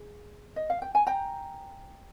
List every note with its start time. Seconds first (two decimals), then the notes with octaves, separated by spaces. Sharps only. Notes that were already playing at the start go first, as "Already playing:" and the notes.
Already playing: G#4
0.56 D#5
0.70 F5
0.82 G5
0.95 G#5
1.07 G5 A#5